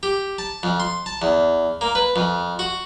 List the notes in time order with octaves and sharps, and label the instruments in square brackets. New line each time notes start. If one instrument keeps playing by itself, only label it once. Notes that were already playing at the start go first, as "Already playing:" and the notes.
[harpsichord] G4
A5
F2
C6
A5
E2
A#3
B4
F2
F#4